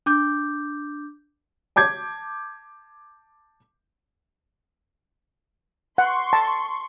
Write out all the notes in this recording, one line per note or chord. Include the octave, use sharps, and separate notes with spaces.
D4 D6 G6
A5 D6 G6 G#6
F#5 C6 C#6
A5